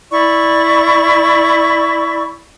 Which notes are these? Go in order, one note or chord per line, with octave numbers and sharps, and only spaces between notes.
E4 D5 C#6